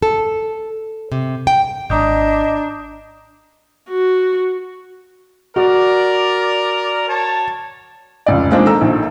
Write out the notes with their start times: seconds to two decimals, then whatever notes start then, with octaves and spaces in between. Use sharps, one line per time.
0.02 A4
1.12 C3
1.47 G5
1.90 G#1 D4 D#5 A#5 D#6 G6
3.90 F#4
5.56 F#4 A#4 D5
7.09 C#5 A5
8.26 F1 C#2 D5
8.50 F3 G#3 A#3 C4 D4 D#4
8.65 D#3 A4 A#5 E6
8.81 A#1 D#3